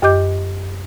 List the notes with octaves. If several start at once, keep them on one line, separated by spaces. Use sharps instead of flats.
F#2 G4 D#5 D6 G6